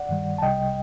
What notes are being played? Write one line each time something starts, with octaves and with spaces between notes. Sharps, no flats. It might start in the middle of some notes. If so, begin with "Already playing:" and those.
Already playing: D5 F#5
G2 D#3 G3
A5
C2 C3 G3 D#5 G5